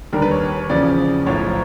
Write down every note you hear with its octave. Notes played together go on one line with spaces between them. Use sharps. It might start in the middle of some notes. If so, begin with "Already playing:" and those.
D#2 D3 G3 A#4
B4
C#5
E2 C#3 F3 D5
B1 A2 F3 C#5